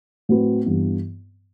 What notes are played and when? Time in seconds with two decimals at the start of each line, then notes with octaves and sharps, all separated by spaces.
0.29 A2 F#3 C4 F#4 B4
0.66 G2 E3 B3